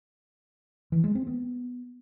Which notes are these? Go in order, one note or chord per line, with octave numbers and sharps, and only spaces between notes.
E3
G#3
C4
B3